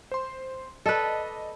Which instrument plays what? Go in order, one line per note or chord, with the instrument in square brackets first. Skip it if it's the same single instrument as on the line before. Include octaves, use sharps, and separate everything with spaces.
[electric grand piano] C5 C6
[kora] A4 B4 [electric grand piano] D5 D#5 A5